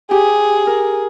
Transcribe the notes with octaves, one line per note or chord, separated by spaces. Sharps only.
G4 G#4 G5
A#4